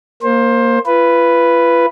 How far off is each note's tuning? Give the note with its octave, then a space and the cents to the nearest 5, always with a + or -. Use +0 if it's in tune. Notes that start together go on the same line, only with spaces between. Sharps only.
A#3 +0 C5 +20
F4 -40 B4 +0